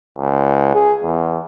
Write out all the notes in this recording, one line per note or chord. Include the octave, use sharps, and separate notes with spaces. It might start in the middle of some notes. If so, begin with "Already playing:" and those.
C#2
G#4
E2